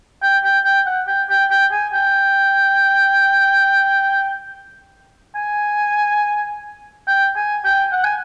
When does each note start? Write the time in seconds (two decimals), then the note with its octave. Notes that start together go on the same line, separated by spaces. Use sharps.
0.22 G5
0.44 G5
0.65 G5
0.86 F#5
1.07 G5
1.30 G5
1.50 G5
1.72 G#5
1.93 G5
5.35 G#5
7.07 G5
7.36 G#5
7.65 G5
7.93 F#5
8.04 G#5